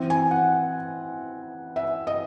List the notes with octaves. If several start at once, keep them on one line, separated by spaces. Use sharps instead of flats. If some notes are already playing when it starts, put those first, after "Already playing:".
Already playing: E3 C4
G#5
F#5
E5
D#5